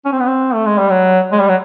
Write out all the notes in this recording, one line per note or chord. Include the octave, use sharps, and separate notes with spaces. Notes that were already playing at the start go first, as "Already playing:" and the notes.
C#4
C4
B3
C4
A3
G#3
G3
F#3
G#3
G3
F#3